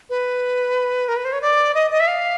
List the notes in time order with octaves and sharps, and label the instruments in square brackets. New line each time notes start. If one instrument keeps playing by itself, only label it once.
[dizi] B4
A#4
B4
C5
C#5
D5
D#5
D#5
E5
F5